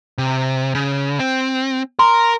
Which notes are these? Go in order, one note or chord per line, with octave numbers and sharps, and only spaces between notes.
C3
C#3
C4
A#4 A#5 C6